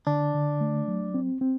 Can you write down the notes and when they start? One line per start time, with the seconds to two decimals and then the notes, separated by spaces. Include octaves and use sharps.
0.07 D3 D4
0.34 D3
0.61 A3
0.88 F#3
1.14 C4
1.41 C4